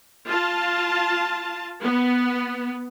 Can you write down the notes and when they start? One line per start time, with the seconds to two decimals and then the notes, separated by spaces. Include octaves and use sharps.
0.29 F4 A5
1.82 B3